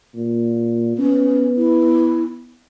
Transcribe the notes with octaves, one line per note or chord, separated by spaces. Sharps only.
A#2
B3 C#4
E4